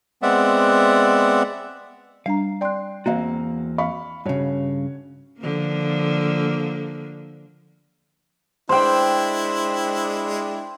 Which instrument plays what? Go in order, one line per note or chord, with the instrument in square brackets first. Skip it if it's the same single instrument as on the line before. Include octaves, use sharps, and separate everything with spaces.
[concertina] G#3 B3 C4 D5 E5 F#5
[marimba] G3 D4 A#5 [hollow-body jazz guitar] F5
[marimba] D5 F#6 [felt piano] G5 C6
[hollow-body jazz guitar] E2 A#3 F#4 [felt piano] C4 F5 A#5
[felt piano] F5 B5 C#6
[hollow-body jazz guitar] G2 C#3 [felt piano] F#4 C#5
[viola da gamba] D3 F3 A#3
[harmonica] G#3 D4 E4 [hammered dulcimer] C5 G5